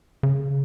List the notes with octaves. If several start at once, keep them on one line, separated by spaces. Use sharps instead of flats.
C#3